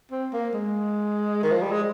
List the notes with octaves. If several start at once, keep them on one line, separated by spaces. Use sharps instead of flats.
C4
A#3
G#3
D#3
F3
G3
G#3